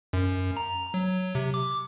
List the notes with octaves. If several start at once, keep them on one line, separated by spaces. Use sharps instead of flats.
F#2
A#5
F#3
C3
D6